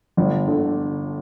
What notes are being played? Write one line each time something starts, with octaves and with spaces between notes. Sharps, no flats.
G1
D3